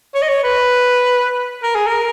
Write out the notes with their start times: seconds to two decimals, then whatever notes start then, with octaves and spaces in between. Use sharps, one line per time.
0.15 C#5
0.22 D#5
0.29 C#5
0.44 B4
1.63 A#4
1.75 G#4
1.87 A#4